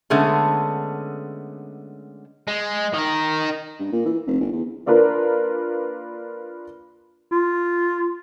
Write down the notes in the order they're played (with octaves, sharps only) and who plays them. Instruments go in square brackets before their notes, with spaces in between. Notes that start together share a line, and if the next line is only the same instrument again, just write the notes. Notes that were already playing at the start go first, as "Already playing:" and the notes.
[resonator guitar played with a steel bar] D3 G#3 A3 B3 C#4
[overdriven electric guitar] G#3
D#3 D#4
[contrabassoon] G2
A#2
E3
F1
G1
E2
[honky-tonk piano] A#3 D4 F4 A#4 B4
[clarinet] F4